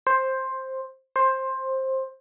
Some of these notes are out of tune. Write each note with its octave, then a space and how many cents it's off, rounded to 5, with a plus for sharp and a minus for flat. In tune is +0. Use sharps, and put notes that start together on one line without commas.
C5 +10
C5 +15